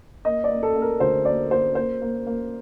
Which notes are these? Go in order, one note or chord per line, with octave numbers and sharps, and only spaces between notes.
A#3 D#5
D5
A#3
A4
A#3
A#4
D2 C5
A#3 D5
A#3 C5
A#3 C5
A#3
A#3